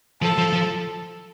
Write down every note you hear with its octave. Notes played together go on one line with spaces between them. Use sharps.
F3 A4
F3
F3